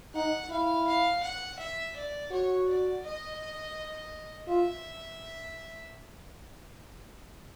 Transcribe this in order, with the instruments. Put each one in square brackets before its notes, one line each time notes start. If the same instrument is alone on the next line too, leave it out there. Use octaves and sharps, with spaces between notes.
[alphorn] D#4 [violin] F#5
[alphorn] E4 [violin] F5
[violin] F5
F#5
E5
D5
[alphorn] F#4 [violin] C#5
[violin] D5
D#5
[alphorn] F4 [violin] E5